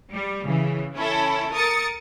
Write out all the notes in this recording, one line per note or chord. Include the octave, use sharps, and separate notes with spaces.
G3
C#3 E3
C#4 E4 A4
A#4 D#6 A6 C#7